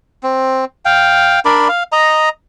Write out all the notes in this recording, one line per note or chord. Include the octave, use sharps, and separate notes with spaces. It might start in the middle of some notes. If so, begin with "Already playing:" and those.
C4
F5 G5
D4 A#4 D5 B5
F5
D#5 A#5